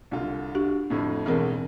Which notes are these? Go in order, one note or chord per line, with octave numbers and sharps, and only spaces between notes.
C2 D3 F4
D4 F#4 G4
F2 A2 D3
B1 E2 E3 G#3 C4 A#4